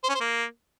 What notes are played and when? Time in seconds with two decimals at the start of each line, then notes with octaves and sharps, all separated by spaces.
0.04 C5
0.09 C#4
0.15 C5
0.21 A#3